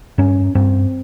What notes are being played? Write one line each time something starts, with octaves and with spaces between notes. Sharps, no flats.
G2 C#4
G2 C4